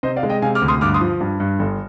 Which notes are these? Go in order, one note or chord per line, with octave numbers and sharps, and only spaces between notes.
C3 C5 D#5
D5 F5
G#3
D#5 G5
C3 F5 G#5
D6 F6
D2
C6 D#6
G2 D6 F6
C6 D#6
F3
G2
G2
G1